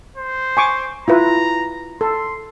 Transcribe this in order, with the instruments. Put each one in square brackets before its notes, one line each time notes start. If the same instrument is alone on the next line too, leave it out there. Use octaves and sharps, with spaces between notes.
[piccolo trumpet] C5
[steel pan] G#5 C#6 D6
[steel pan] E4 F4 B4 [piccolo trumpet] A#5
[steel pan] A4 [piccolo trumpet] C6